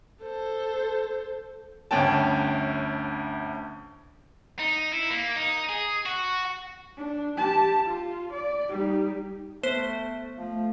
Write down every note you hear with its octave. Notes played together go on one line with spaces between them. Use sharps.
A4 C5
G1 D2 C#4 G5 A5
D#4
E4
A#3
D#4
G#4
F#4
D4
G4 A5
F4
D5
G3 D#4
A3 B3 C5
F3 A3